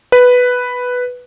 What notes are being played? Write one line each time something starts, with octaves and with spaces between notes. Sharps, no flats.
B4